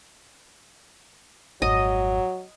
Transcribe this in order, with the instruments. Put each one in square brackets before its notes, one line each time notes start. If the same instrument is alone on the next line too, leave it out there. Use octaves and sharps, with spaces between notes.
[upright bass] G#1 F2 [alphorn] F#3 [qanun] D#5